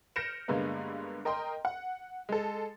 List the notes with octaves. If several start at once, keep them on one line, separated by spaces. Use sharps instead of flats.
F6 G6 A#6 C#7 D7 E7
G2 D3 G#3 A#3 B3
A#4 D#5 G5 C6
F#5
G#3 A4